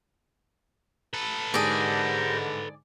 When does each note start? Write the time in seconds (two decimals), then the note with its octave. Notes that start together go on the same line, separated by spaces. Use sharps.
1.14 A4 B4
1.54 G#2 D3 G4 G#4 A#4 D5